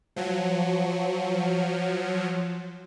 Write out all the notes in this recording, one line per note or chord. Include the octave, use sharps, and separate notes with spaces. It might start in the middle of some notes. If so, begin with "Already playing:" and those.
F3 F#3